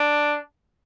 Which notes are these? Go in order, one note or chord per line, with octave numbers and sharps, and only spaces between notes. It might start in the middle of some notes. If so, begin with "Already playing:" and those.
Already playing: D4